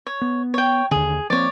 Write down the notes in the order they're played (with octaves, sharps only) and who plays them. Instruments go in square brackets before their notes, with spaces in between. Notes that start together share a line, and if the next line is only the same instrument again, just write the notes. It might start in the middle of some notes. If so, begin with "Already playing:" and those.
[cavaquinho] C#5
[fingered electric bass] B3
[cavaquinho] C#5 G5
[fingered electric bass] D#2 D3 [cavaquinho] G#4
[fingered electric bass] F3 A#3 C4 [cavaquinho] C#5 D5